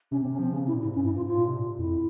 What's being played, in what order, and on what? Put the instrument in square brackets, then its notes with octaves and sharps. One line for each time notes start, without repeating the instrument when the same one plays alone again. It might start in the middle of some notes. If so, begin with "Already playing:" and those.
[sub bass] C3 [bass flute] C#4
[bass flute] C4
[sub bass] C3
[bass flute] C#4
[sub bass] F3 [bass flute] C4
[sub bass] C#3 [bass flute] C#4
[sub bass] C3 [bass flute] E4
[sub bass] A#2
[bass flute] E4
[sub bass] G#2
[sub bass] G2 [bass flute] C#4
[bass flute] E4
[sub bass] G#2 [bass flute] F4
[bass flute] F4
[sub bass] A#2
C3
A#2
[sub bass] F2 [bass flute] E4